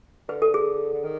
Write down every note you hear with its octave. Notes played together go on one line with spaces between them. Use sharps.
D3 B4
A4
G#4
D3
D#3